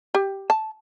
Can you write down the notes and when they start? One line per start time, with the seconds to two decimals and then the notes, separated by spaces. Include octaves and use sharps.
0.15 G4
0.50 A5